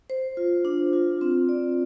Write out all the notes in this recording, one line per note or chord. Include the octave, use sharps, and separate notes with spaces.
C5
F4
D4
F4
C4
D5